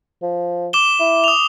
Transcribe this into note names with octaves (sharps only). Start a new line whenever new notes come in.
F3
D6 E7 G7
E4
D#6 F7